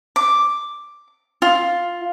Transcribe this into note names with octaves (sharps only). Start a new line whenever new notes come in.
D6
F4